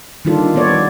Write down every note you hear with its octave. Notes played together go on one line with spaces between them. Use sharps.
D#3 G3 D4 F4 A4
G3 B3 A4 C#5 D5
F3